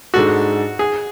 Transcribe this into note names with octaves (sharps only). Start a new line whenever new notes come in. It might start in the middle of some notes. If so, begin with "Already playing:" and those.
G#2 G#3 D4 F#4 A4
G#4